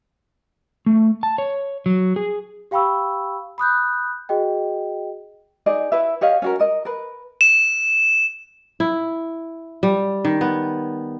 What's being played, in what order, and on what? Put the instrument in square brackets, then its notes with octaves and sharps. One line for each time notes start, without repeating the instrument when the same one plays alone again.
[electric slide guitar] A3
A5
C#5
F#3
G#4
[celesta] G4 F5 G5 B5 C#6 E6
B5 D#6 F#6 G6
F#4 G#4 D#5 G5
[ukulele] D#4 G#4 D5 D#5
E4 B4 E5
G4 C#5 D#5 F5
C#4 F#4 A#4
A#4 D#5
A#4 B4
[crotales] E7
[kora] E4
G3
D#3
B3